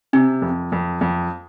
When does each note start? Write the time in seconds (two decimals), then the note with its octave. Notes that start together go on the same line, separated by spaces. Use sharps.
0.13 C3 C4
0.42 F2
0.72 F2
1.01 F2